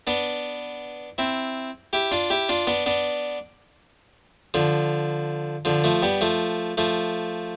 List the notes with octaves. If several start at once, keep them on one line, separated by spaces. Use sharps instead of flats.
B3 D4
C4 E4
E4 G4
D4 F4
E4 G4
D4 F4
B3 D4
B3 D4
D3 F3
D3 F3
F3 A3
G3 B3
F3 A3
F3 A3